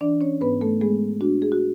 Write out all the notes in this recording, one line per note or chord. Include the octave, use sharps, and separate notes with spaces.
E3 D4 D5
C#4 C#5
G#2 B3 B4
A3 A4
G#3 B3 G#4
D4 F#4
G#4
F#4